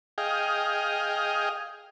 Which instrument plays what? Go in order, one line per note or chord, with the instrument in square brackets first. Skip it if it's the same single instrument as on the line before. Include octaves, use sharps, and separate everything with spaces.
[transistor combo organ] G#4 D#5 F5 G5